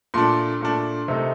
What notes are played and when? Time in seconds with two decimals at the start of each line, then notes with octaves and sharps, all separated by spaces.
0.14 A#2 A3 D4 C6
0.61 A#2 A3 D4
1.08 C3 D#3 A3 D#4